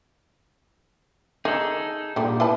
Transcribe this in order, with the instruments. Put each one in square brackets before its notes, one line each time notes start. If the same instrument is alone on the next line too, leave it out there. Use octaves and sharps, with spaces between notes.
[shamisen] D#3 [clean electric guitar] D#4 G#4 A4
[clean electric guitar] A#2 [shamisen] D3 G3
[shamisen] E4 B4 A5